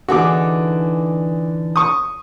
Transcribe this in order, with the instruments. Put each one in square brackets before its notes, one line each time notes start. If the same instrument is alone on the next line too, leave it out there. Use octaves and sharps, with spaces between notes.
[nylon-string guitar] D3 E3 D#4 [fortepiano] F#4 G#4 D6
[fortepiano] C#6 D#6